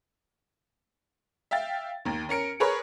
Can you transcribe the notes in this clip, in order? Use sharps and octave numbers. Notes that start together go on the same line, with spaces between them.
E5 F5 G5 A6
D#2 D#3
C#4 A#4 C#7 D7
G#4 A#4 B4 C#5